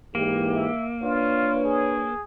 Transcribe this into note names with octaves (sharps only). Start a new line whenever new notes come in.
G#2 E3 A#3 G4
E5
D4 F4 B4 C#5
G#4